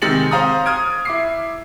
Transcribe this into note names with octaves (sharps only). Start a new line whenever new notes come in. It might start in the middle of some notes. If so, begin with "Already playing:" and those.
C3 D#3 G#3 A6 C#7 F#7
C5 F5 A#5 D#6
D#6 F6 G#6 D7
E4 D6 C7